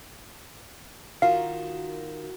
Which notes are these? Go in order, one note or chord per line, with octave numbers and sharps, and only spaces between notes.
D#3 F4 F#4 A#4 F5